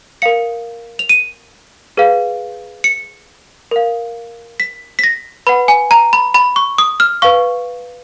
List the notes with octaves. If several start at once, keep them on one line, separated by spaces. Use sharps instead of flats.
A#4 F5 C#7
F7
D#7
G#4 B4 F5
C#7
A#4 F5
B6
B6
A#6
B4 F#5 B5
G#5
A#5
B5
B5
C#6
D#6
F6
B4 F5 C#6